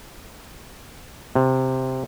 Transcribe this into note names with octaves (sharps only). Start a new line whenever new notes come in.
C3